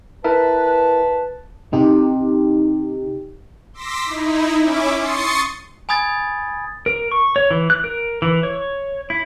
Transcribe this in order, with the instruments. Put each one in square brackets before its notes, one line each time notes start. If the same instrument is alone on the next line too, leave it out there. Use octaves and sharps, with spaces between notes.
[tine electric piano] E4 A#4 E5 [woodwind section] B4 A5
[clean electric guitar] C3 [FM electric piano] D#4 G4
[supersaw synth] C6 D6 E6 A#6 B6
D#4 E4
C#4 E4 E5 D6
C6 C#6 D#6 A6 C7 C#7
[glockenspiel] G#5 B5 D#6 G#6 A6
[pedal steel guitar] A#4
C#6
C#5
E3
F#6
A#4
E3
C#5
E4